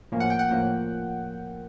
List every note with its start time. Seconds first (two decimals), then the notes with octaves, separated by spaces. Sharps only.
0.12 A2 F3 A#3 C#4
0.20 F#5
0.30 G5
0.39 F#5
0.49 A2 F3 A#3 C#4